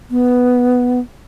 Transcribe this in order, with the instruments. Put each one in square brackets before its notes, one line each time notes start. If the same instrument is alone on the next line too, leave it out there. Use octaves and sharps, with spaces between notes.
[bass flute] B3